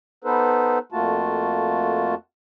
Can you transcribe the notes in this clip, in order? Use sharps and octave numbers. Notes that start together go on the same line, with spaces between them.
B3 D#4 A4 B4 C5
F2 A3 A#3 F4 F#4 A5